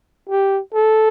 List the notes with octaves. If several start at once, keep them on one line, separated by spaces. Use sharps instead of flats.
G4
A4